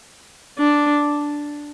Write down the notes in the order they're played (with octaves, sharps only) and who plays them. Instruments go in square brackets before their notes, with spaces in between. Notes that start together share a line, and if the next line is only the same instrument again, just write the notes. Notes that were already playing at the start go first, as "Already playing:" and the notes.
[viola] D4